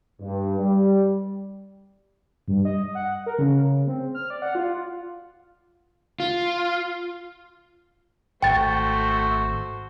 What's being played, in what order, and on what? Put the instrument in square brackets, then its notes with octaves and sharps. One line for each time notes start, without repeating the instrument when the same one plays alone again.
[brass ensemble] G2
G3
[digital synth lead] G2
D#5
F#5
A#4
C#3
C4
F6
D5
F#5
F4
[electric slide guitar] F4
[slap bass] G#1 [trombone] A3 [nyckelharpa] F#4 C5 [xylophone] G5 A6